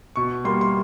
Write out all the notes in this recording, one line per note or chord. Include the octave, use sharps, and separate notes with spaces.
B2 C#6
G3 A#3 C6
C6